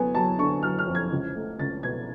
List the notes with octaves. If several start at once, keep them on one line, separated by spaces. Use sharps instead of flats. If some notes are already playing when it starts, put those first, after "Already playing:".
Already playing: F#3 B3 G#5
F#3 A5
D3 C#6
F#3 F6
F6
F2
G#6
C#2
A3
C#2 A6
B2 G#6